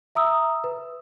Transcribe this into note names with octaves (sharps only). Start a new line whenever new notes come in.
E5 A#5 D#6 E6
B4